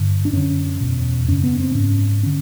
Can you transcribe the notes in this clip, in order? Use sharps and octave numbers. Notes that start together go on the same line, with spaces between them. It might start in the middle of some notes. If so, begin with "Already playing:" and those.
Already playing: G2 D3
D4
F#2 D3 C#4
E2 B2
F#2 C#3 C#4
B3
C4
G#2 C#4
D3 C#4